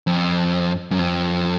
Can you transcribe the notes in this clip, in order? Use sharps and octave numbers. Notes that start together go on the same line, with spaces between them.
F2
F#2
F2